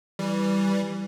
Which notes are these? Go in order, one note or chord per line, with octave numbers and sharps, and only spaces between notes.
E3 G3